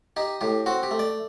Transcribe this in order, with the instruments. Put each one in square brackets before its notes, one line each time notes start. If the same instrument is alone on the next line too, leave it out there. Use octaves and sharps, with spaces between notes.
[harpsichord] D#4 G4
A2 G4
C4 F#4
G4
A3
D5